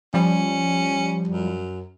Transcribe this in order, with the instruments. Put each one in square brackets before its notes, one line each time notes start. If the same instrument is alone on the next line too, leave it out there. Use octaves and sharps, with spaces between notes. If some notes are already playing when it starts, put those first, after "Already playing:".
[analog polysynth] F3 G3 [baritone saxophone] C#4
[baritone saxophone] F#2